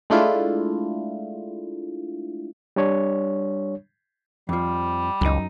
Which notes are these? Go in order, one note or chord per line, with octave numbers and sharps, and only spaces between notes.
G#3 A3 D4 E4 F4
G3 D4 C#5
F2 F3 G3
C#2 F#2 D#4